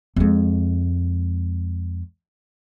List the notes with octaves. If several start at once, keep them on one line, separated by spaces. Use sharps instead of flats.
F2 G#3